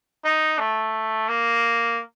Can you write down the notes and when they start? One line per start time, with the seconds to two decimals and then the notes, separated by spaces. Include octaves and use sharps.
0.25 D#4
0.59 A3
1.28 A#3